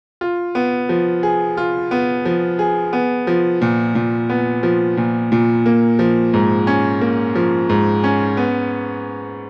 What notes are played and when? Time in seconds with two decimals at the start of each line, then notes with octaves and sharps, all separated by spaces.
0.21 F4
0.55 B3
0.89 F3
1.23 G#4
1.57 F4
1.91 B3
2.25 F3
2.59 G#4
2.93 B3
3.27 F3
3.62 A#2
3.95 A#2
4.29 B3
4.63 F3
4.97 A#2
5.32 A#2
5.66 A#3
5.99 F3
6.34 G#2
6.67 C#4
7.01 A#3
7.35 F3
7.69 G#2
8.04 C#4
8.37 B3